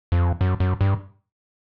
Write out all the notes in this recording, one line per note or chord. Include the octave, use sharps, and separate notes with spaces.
F2
F#2
F#2
G2